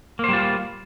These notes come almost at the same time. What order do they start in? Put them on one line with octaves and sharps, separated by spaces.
A#3 C5 G3 F4